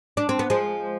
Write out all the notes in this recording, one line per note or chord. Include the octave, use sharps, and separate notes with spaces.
D4
C4
B3
F3 G#3